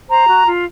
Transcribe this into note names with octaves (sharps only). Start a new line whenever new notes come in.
C5 A#5
F#4
F4